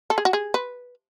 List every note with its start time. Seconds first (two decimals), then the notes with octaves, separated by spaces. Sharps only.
0.10 A4
0.18 G#4
0.25 F#4
0.33 G#4
0.54 B4